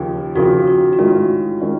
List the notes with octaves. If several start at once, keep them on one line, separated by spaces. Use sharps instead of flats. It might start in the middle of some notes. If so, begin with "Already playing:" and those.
Already playing: D#2 C#3 F3 G4
D#2 C#3 F3 F#4
F#4
F#4
A1 G#2 D#3 G#3 C#4 F4
D#3 G#3 C#4